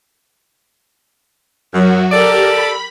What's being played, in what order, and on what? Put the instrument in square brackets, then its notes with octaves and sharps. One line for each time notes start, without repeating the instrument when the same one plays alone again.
[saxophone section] F#2 [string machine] F#3 F#4
[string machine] G4 A#4 [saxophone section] A4 D5
[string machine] B5